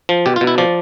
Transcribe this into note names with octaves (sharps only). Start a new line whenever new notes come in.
F3
B2 G4
F4
B2
E4
F3 D5